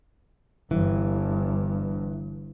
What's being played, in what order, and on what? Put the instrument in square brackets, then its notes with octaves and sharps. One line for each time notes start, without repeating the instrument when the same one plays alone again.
[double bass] G1 G2 [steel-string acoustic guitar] E3